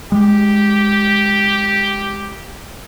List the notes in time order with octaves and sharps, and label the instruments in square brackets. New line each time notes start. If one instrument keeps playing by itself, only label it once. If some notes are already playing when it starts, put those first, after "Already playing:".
[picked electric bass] G#3 [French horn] G4